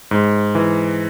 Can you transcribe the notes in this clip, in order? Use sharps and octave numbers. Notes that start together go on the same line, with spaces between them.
G#2
E3